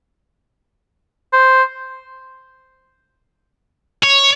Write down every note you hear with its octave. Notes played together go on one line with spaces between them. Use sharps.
C5
C#5